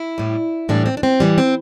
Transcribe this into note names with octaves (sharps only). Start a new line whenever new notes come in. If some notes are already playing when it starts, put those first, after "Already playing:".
Already playing: E4
A2 G3
A2 E3 G3 D4
C4
D4
C4
A2 E3 G3
C4